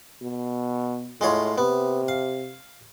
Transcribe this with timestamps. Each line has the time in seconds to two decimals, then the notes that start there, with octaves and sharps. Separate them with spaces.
0.22 B2
1.21 A2 G#3 F4 C#5
1.58 C3 B3
2.08 F5